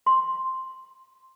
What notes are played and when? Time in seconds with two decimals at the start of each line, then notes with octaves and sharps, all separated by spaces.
0.06 C6